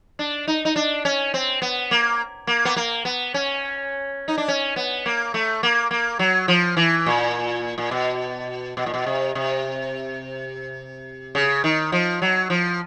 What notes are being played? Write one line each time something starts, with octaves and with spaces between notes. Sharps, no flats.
D4
D#4
D#4
D4
C#4
C4
B3
A#3
A#3
B3
A#3
B3
C#4
D#4
D4
C#4
B3
A#3
A3
A#3
A#3
F#3
F3
E3
A#2
A#2
B2
B2
A#2
B2
C3
C3
C#3
D#3
F3
F#3
F3